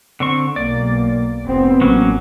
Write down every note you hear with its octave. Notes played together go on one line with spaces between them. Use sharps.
D3 C4 C#6
B1 A#3 D5
F1 B3 C4
A1 F#3 A#3 C#4